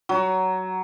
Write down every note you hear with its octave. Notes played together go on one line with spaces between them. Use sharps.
F#3